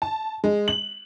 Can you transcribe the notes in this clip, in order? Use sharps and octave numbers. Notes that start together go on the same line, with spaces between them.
A5
G#3
F#7